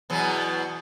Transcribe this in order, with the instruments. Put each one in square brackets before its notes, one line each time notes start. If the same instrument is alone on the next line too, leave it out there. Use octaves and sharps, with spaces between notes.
[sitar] E2 B2 F#3